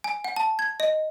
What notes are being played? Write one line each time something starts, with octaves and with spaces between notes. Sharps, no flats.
G#5
F#5
A5
G#6
D#5